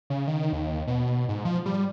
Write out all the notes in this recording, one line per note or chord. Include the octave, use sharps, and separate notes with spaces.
C#3
D#3
D#2
B2
G#2
F3
G3